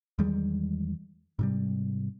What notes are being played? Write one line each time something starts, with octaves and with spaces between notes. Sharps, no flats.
E2 D#3 G3 G#3
G#2 C3 G3